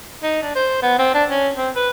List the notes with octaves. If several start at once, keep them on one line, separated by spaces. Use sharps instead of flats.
D#4
D4
C5
B3
C4
D4
C#4
C4
B4